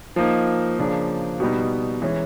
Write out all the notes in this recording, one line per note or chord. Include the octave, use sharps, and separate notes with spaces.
F3 A#3 D#4
C#3 F3 A#3 D4
B2 G3 B3 D#4
E3 G#3 C#4